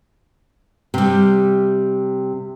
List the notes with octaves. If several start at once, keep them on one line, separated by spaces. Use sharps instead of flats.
C3 G3